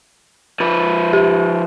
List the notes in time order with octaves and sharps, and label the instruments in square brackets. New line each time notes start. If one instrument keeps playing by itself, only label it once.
[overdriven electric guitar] F3 B4
[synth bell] G4